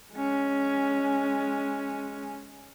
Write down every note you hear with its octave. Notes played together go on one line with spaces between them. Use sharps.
G#3 C#4